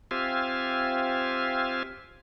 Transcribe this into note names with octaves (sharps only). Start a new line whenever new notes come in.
C4 F4 G4 E5 F5 G#5